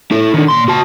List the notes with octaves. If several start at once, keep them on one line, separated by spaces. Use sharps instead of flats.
E4 A4
D3 D#3
A#2 C6
F#4 A5